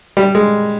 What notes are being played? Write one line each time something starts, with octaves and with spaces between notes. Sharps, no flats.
G3
G#3